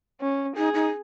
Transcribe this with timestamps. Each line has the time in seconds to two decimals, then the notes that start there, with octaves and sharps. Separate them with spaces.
0.21 C#4
0.57 D#4 G#4
0.74 D#4